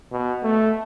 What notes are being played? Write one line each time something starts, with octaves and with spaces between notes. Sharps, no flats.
B2
A3